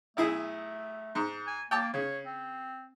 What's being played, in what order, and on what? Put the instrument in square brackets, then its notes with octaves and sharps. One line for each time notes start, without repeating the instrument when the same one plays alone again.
[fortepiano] B1 E4 G#4 [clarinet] A3
[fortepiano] G#2
[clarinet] G#5
[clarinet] A#3 [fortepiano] G5 A5 D6
[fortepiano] C#3 [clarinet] C#5
[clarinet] C4